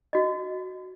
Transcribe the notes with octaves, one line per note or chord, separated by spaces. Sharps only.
F#4 D#5